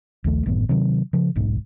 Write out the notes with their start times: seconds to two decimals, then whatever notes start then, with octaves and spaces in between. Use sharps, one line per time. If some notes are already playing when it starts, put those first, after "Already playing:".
0.24 A#1 D#2 A3
0.46 G#1 F#2 A2 B3
0.69 C3 D#3 F#3
1.13 C#3 F3
1.36 D1 B1 G#2